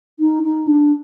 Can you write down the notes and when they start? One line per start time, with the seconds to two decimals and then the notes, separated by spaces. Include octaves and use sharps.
0.20 D#4
0.43 D#4
0.67 D4